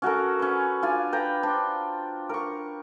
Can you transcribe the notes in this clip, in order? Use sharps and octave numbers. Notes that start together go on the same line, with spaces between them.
C#4 F#4 A4 A#4
C#4 B4
D4 F4 G#5
B4 G5 A#5
D4 C5
A#4 C#6